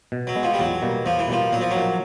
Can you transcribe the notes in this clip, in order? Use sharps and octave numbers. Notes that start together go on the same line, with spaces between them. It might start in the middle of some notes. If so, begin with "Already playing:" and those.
B2
F#3
G#3 B3
F3
G3
E2 F#3
B2 G3 A#3
E2 F3
E3
B2 F3 G3 A#3
A#2 F#3
F3
F#3
F3 A#3 D#4